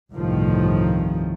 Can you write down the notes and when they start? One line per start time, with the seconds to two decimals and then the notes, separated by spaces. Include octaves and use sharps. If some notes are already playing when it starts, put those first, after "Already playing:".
0.12 G1 C2 A2 D#3 F3